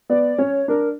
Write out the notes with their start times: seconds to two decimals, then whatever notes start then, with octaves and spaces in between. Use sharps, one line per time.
0.09 B3 D5
0.38 C#4 C#5
0.68 D4 A#4